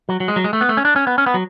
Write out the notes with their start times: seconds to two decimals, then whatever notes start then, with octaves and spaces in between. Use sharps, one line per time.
0.09 F#3
0.20 F#3
0.28 G#3
0.36 F#3
0.44 G#3
0.53 A3
0.61 B3
0.69 A3
0.77 C#4
0.85 D4
0.96 C#4
1.07 B3
1.18 C#4
1.26 B3
1.34 F#3